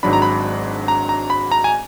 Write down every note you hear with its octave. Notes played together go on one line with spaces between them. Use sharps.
G#1 G#2 F#3 D4 B5
A#5
B5
A#5
A#5
B5
A#5
G#5